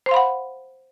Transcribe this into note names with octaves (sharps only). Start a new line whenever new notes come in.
C5 F5 F#5 B5 C6